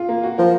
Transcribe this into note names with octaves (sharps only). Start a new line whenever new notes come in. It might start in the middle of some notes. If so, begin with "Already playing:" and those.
Already playing: F4 G#4
A#3
F#4
F3 A#4